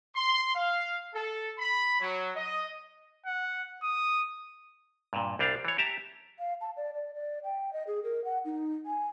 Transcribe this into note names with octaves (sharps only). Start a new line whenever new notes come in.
C6
F5
A4
B5
F#3
D#5
F#5
D#6
G2 A#2
C2 G3 D4 F5
E3 C#5
G4 E5 A5 A#5
F5
A5
D5
D5
D5
G5
D#5
G#4
A#4
F#5
D#4
G#5